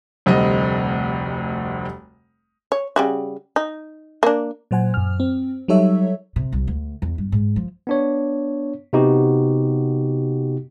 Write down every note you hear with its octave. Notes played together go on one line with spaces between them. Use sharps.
F1 D2 G3 C4 D#5
C#5
C#3 G3 F#4
D#4
A#3 D4
A#2 F#3 C5 F#5 G#5
F#2 F6
C4
F#3 G3 D#4 A4 C#5 E5
C3
C2
D2
E2
G2
G#2
F3
B3 D4 C#5
C3 B3 D#4 F#4 G4